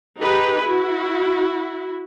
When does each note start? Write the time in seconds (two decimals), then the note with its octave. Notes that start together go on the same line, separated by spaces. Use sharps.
0.21 D#4 G4 G#4 B4
0.65 E4 F#4